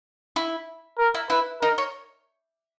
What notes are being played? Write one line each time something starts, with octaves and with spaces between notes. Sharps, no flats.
E4
A#4
E4
E4 B4
D#4 A#4
C#5